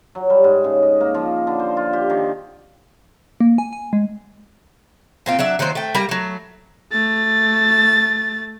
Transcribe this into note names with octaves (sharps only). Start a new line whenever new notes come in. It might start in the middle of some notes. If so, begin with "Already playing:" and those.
F#3
G3
G#2
C#3
D#5
A#3
F3
D3
C5
F4
G4
D#3
A#3
G#5
G#5
G#3
A#2 C4 F4
F#3 D4 E5
D#3 F#3 A#3 C5
A3 G5
G3 A#3 A#5
F#3 A3
A3 A6